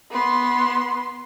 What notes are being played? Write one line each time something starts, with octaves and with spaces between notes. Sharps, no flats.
B3 C6